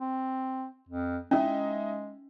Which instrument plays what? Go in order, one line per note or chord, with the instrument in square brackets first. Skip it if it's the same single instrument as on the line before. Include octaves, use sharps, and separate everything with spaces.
[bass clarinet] C4
F2
[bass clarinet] G#3 [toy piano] C#4 [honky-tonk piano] D#4 E4 D#5